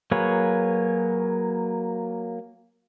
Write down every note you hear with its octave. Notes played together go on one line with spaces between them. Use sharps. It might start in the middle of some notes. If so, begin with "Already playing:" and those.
F#3 A#3 G#4 B4 C#5